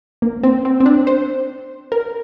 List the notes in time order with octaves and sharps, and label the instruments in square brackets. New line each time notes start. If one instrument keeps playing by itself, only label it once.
[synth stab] A#3
C4
C4
C4
D4
C5
A#4